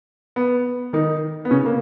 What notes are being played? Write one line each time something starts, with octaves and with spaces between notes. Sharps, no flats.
B3
D#3 D#4
B3
C#3 C#4
A#3